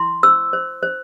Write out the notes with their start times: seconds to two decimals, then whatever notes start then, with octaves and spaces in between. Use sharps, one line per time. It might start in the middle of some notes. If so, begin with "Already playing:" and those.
Already playing: E4 C6
0.23 C5 E6
0.53 C5
0.83 C5